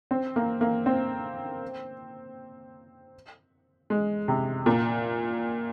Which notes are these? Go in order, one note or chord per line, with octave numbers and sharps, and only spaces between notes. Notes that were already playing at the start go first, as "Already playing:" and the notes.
C4
A#3
A#3
C4
G#3
C3
A#2